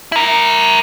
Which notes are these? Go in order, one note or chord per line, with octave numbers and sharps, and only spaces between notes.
E4 A#4